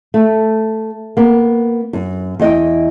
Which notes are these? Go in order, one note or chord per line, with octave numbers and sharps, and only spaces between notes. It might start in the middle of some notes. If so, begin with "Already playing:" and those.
A3
A#3 B3
F#2
E2 D#5 G5